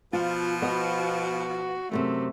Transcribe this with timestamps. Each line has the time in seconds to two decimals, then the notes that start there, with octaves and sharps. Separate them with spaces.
0.13 B2 F3 F4
0.62 B3 F#4 D#5
1.91 F#2 A2 C3 A3